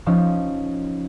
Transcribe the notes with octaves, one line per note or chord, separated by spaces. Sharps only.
F3 C#4 D#4